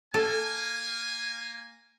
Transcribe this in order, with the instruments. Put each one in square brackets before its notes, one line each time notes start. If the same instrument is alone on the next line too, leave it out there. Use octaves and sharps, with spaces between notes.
[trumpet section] A#3 G#5 [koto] A4